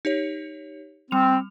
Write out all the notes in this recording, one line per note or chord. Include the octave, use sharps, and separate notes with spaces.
D#4 G4 C#5
G3 C4 F7